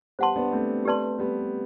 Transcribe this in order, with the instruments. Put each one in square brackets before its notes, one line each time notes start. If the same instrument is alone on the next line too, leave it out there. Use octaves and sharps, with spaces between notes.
[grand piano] G3 B3 [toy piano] C5 F#5 A5 C6
[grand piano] B3 D4
A3 C4
[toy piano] G4 B4 D5 A5 C6
[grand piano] G3 B3